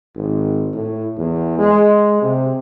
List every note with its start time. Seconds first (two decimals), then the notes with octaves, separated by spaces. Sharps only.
0.16 G#1
0.74 A2
1.18 E2
1.59 G#3
2.22 C3